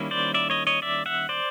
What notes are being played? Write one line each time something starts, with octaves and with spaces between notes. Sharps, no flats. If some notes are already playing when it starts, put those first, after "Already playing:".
Already playing: D#3 G3 A#3 C#4 E4
C5 D5
D5 E5
C#5 D#5
C#5 D#5
D5 E5
E5 F#5
C5 D5